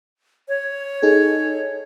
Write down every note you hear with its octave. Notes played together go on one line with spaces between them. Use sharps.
C#5
D#4 G#4 A4